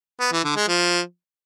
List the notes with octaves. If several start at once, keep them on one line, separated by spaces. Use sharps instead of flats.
B3
E3
D3
G#3
F3